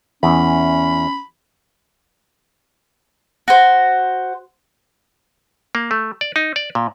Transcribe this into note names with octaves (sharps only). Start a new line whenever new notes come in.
E2 C#4 B5
F#4 C5
A#3
A3
D5
D#4
D5
A#2